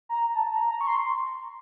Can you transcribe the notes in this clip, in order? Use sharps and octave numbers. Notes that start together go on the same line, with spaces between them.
A#5
A5
A#5
A#5
C#6
C6